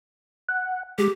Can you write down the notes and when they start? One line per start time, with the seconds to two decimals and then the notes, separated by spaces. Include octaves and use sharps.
0.49 F#5
0.98 G#3 G4